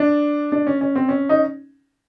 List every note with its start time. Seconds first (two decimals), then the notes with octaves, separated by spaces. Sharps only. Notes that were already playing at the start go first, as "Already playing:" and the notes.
Already playing: D4
0.52 D4
0.67 C#4
0.81 C#4
0.96 C4
1.09 C#4
1.29 D#4